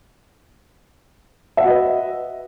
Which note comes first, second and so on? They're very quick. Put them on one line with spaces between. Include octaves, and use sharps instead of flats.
E5 F#5 F#4 D#5 B4